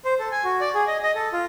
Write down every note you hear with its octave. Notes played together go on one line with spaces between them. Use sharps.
C5
A4
G#5
F#4
D5
G#4
D#5
D#5
A4
F4